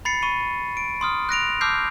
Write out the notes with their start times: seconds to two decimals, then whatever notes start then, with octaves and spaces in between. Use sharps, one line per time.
0.05 B5 A6 C7 C#7
0.22 B5 C#6 D#7
0.77 D7
1.01 C6 D#6 F6
1.29 F#6 A#6 D7 F7
1.61 A5 D6 E6 F6 G6 C7